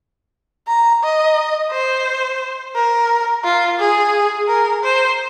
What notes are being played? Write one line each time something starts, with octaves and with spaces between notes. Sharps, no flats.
A#5
D#5
C5
A#4
F4
G#4
A#4
C5